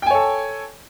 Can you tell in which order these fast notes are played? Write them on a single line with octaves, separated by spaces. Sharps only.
G5 G#5 C#5 A4